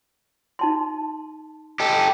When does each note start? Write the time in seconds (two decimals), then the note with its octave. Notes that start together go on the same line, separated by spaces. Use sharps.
0.59 D#4 A5 C6
1.80 G4 A4 D#5